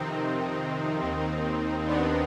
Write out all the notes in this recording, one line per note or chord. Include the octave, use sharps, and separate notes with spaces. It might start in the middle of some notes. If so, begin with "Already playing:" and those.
Already playing: F2 C3 D#3 C4 D#4
D#2 D#3
B3 D4